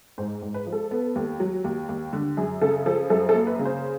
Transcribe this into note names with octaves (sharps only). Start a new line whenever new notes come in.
G#2 C5
G#2
B4
F3
A4
B3
D#2
F#3
D#2
D#2
D3
F#2 G#4
C#3 A4
F3 A4
F#2 A4
A4
A#3
B4
C#3
C5